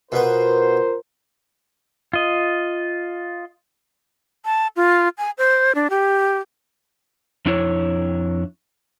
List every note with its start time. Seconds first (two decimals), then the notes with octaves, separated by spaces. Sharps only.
0.12 B2 B3 F4 A#4 C5
2.13 F4 D#5
4.45 A5
4.76 F4
5.18 G#5
5.38 C5
5.75 D4
5.90 G4
7.46 F2 D4 E4 C#5